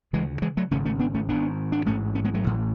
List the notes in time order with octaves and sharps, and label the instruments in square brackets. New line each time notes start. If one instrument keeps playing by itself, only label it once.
[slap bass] D2 C#3 E3 G#3
E3 G#3
F#3 A3
G#1 F#2 C#3 A3 C#4
A3 C#4
B3 D4
A3 C#4
G#1 G#2 B3 D4
D4
A1 G#2 A3 C#4
A3 C#4
G#3 B3
F#3 A3
A1 A2